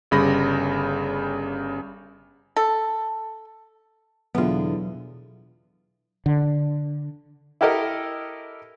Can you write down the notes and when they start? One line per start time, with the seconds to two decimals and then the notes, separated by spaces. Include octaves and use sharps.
0.11 G1 C#3 G3 B5 A#6
2.56 A4
4.35 E2 B2 D3 F#3 B3 F4
6.26 D3
7.61 E4 G4 A4 A#4 D#5